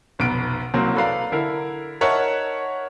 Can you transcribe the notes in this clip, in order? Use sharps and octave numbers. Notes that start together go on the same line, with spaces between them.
F1 B1 B3 D7
C2 F#3 A#3 C4
A4 B4 D5 F5 A#5 B5
D3 E4 A#4
D#4 A#4 C#5 E5 F#5 A5